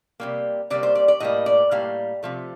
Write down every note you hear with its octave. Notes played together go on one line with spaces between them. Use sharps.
C3 G3 A#3
C3 G3 A#3 D5
C5
D5
D5
A2 G3 A#3 D#5
D5
A2 G3 A#3 F5
C3 F3 A3